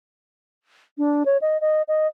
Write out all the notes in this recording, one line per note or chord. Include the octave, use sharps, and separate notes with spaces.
D4
C#5
D#5
D#5
D#5